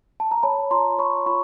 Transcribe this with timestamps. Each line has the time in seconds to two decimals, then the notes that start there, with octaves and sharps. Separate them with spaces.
0.20 A5
0.31 A#5
0.43 C#5 A5 B5
0.71 F4 A#5 C6
0.98 C#5 B5 C#6
1.26 F4 B5 C#6